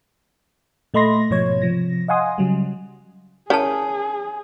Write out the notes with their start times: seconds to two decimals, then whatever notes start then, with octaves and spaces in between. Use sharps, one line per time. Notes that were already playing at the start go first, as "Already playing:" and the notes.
0.94 A#2 A3 D#5 B5 C6 A#6
1.30 G#2 B2 F3 C#5 G#6
1.62 C3 F3 A#6
2.08 D#5 F5 F#5 G#5 C6 D#6
2.38 C#3 F#3 G3
3.50 C#4 E4 G#4 A#4 C#5 A5